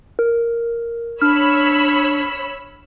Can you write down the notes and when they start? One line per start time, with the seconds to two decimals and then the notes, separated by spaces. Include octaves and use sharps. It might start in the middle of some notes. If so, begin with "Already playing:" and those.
0.19 A#4
1.21 D4 C#5 B5 E6 F6